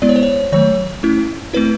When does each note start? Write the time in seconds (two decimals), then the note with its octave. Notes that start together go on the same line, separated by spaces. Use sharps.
0.02 G#3 B3 E4 D5
0.09 C#5
0.16 C5
0.23 C#5
0.52 D#3 F#3 A3 C#5
1.03 A3 C#4 E4
1.54 A3 C4 E4 B4